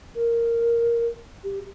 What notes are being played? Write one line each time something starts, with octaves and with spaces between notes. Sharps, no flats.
A#4
G4